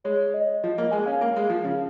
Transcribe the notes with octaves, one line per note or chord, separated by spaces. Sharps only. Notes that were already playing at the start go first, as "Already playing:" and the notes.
G#3 C#5
D#5
F3
A#3
G#3 G#5
C#4 F5
A#3
G#3
F3
C#3